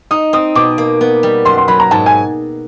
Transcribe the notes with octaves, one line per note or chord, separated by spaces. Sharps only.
D#4 D#6
C4 D#6
B2 D6
A#3
B3
G3
F#2 C6
C6
F#3 B5
A#5
G#2 A5
G#5